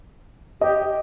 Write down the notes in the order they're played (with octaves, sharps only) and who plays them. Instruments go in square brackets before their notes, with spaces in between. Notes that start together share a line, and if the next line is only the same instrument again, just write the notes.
[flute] G4 [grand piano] D#5